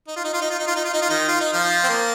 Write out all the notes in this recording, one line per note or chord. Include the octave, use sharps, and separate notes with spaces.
D#4
F4
D#4
F4
D#4
F4
D#4
F4
D#4
F4
D#4
F4
D#3 D#4
F4
D#4
F3 F4
C4
A#3